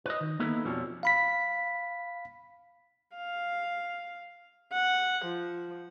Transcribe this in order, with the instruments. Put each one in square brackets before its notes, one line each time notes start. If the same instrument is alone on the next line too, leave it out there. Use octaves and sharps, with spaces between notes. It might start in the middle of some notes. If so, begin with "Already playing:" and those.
[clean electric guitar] B4 D#5
D#3
A#3 B3 D#4 E4 A4 B4
F2 B2 F3 G3 C#4 A4
[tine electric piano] F5 B5 B6
[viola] F5
F#5
F3